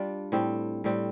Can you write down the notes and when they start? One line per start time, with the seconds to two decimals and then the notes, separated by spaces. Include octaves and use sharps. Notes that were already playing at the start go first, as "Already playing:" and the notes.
Already playing: G3 D4 F4
0.32 A2 G3 C4
0.84 A2 G3 C4